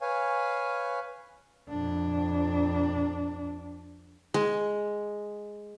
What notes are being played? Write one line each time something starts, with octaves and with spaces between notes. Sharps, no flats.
B4 C#5 F5 G#5
F2 D4
G#3